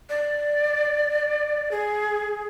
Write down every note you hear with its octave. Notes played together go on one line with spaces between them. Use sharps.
D5
G#4